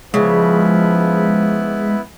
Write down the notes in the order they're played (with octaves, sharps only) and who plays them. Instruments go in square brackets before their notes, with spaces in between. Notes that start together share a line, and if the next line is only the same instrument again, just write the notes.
[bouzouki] C#3 [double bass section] F3 [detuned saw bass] G#3 [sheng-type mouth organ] B3 E4